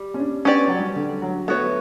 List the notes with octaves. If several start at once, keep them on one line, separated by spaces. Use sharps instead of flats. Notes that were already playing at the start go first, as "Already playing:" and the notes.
Already playing: G3
C#4
D4
B3 C#4 G4 D5
F#3
G3
D3
F#3
A3 B3 F#4 C#5